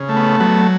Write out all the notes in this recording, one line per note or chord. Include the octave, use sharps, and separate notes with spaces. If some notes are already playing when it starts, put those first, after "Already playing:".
Already playing: C#3
A3
B3
F#3 B3